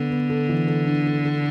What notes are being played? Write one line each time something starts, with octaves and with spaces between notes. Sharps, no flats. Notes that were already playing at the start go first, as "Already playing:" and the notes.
Already playing: D3 B3 D4 A4
B3
A4
E3
A4
D4
A4
A4